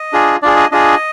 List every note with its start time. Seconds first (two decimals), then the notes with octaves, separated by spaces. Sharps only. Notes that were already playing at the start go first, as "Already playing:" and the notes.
Already playing: D#5
0.13 D4 F4 G#4
0.42 D4 F4 G#4 D5
0.56 D#5
0.72 D4 F4 G#4 D#5